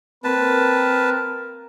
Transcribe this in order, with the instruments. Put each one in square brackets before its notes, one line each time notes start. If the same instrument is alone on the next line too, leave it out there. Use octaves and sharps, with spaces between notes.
[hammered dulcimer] A#3 [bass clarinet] C4 [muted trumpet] A#4 [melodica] B4 A5